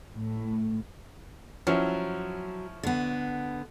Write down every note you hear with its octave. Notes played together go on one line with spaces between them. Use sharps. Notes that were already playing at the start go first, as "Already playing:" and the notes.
A2
F3 F#3 C#4 E4
D3 B3